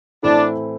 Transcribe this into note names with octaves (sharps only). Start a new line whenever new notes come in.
A2 E3 A3 C4 D4 E4